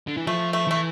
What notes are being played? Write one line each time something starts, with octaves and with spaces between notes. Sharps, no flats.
D3
E3
F3 A3
A3
E3 A3